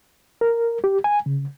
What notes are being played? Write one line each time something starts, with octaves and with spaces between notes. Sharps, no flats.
A#4
G4
G#5
C#3